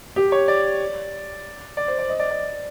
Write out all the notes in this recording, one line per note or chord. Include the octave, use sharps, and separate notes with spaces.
G4
C#5
D5
D5
C5
D5
D#5
D5
D5